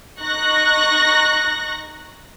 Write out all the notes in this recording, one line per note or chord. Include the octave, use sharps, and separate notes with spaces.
D#4 C#6 F#6 A#6